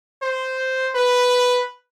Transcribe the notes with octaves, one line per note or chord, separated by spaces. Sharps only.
C5
B4